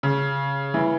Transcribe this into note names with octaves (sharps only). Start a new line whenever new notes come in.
C#3
E3